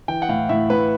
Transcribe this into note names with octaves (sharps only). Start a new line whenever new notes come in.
E3 G5
F#5
A2 F5
A2 E5
A2 B4